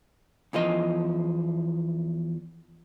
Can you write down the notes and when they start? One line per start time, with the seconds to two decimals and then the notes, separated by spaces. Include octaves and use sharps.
0.53 E2 E3 F3 D#5